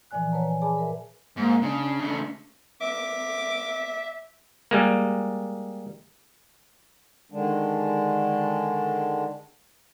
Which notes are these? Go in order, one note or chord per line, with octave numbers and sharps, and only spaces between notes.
A#2 E3 F3 D5 G#5 F#6
B4 C#5 D5 F#5 A5 A#5
G#5
G#4 D5 G#5 A5 B5 D6
A#4 B4 E5
G#2 A#3
C#3 D4
C#3 A3
E5 D6
G3 G#3 A#3
D3 D#3 G#3 D4